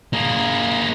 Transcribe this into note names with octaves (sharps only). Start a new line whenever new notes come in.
A#3 G#4